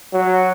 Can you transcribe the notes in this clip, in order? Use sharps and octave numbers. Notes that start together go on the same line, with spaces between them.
F#3